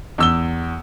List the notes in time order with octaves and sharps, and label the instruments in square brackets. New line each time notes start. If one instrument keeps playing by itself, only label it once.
[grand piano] E2 E6 G7